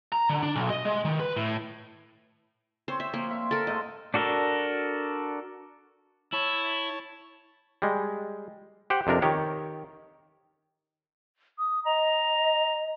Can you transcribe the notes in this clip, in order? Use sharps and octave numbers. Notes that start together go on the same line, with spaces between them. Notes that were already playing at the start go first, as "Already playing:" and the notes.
A#5
D3
D4
B1
D#5
G#3
D#3
B4
A2
C4 C5 C#5
E5
F3 A#3
D5 E5 C6
A4 A#4
G#2 A3 C5 D#5
D4 F#4 A4 A#4
E4 C#5 A5
G3 G#3
G4 C5 F#5 G5
F2 C3 D4 A#4
D#3 G4 C#5
D#6
D#5 A#5